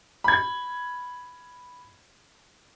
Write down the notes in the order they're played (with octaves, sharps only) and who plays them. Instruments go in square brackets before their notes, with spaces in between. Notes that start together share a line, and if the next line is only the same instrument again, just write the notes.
[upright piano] B5 G#6